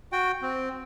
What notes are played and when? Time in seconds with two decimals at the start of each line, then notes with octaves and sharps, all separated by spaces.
0.12 F#4 G5
0.42 C4